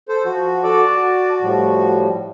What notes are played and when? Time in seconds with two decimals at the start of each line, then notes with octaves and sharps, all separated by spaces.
0.09 A4 C5
0.25 F3 F#4
0.64 F#4 A4 D5 A5 D6
0.85 F#4
1.41 A2 F3 G3